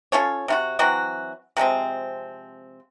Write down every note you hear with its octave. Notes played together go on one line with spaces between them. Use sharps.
C#4 F4 A4 C#5
C3 F4 F#4
E3 F#3 C4 F#4
C3 F3 G#3 C4